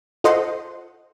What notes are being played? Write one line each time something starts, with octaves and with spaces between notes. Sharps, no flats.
F4 A4 C5 D#5 F#5 C6